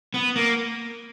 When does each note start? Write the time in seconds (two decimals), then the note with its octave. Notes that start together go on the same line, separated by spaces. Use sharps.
0.14 B3
0.36 A#3